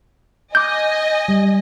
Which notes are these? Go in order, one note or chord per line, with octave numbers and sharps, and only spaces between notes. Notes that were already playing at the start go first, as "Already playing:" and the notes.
D#5 G#5 D6 G6
G3